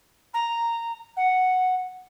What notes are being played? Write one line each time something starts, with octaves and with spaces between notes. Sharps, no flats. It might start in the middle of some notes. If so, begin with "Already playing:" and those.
A#5
F#5